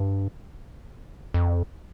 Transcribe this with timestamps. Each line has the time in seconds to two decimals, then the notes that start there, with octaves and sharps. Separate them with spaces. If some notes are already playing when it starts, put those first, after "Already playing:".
Already playing: G2
1.34 F2